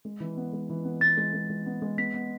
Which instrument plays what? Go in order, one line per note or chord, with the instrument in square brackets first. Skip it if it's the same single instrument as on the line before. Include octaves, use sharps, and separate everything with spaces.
[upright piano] G#3
E3
B3
G#3
E3
B3
[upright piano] E3 [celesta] A6
[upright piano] G#3
G#3
G#3
B3
G#3
[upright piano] B3 [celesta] B6
[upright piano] B3